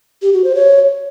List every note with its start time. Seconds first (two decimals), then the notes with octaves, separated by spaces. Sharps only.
0.22 G4
0.33 F#4
0.44 C5
0.55 C#5